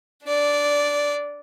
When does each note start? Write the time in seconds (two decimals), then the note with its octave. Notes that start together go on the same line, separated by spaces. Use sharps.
0.25 D4 D5